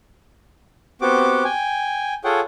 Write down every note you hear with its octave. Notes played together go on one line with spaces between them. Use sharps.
B3 C4 F#4 G4 D6
G5 G#5
F4 G#4 A4 C#5 F#5 G5